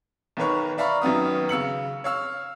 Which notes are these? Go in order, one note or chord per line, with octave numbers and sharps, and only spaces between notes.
B1 D#3 A#4 B4 C#5 C#6
D5 E5 F5 A#5 B5 C#6
F#2 D#3 B3 D#6
C#3 E6 C#7 F#7
C#5 F5 E6